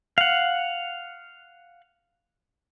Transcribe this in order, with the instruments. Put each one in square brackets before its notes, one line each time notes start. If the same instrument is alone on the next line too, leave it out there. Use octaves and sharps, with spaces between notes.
[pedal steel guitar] F5 F#5